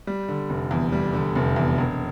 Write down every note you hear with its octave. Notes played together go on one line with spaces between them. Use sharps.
G3
D3
F1
E2
G3
D3
F1
E2
E1